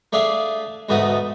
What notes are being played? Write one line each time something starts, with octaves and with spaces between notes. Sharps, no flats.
A3 D4 G#4 E5 F5
D2 G#2 B2 A3 B3 D#6